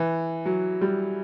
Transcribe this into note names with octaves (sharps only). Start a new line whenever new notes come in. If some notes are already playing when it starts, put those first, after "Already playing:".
Already playing: E3
F#3
G3